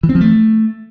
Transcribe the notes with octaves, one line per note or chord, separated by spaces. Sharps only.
E3
C4
F3
A3